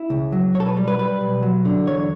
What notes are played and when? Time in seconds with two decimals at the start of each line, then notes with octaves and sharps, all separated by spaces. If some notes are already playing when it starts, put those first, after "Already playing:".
Already playing: E4
0.10 C#2
0.32 F#3
0.54 B1 C#5
0.60 A4
0.66 B4
0.77 G3
0.88 B4
0.99 G3 B4
1.21 B1
1.43 F#3
1.65 D3
1.87 E2 C#5